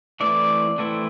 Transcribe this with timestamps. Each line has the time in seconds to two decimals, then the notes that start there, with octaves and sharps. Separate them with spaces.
0.20 E3 A3 C4 E4 D5
0.78 E3 A3 C4 E4